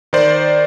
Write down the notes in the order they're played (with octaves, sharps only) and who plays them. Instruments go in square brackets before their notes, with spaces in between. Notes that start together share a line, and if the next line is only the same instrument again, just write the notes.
[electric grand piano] D#3 C5 D5